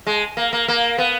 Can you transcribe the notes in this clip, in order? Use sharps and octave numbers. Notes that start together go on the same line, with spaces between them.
G#3
A#3
A#3
A#3
B3